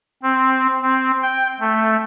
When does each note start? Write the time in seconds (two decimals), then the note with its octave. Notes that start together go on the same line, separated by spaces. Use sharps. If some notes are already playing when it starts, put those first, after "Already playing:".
0.23 C4
0.82 C4
1.22 G5
1.60 A3